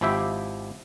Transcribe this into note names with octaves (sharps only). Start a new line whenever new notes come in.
G#1 F3 E4 G4 E5 G5